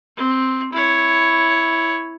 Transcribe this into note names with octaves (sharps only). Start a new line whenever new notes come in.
C4
E4 C#5